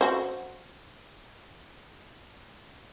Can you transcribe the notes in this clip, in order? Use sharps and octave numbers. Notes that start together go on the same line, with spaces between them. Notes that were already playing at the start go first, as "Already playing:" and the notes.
F#4 C5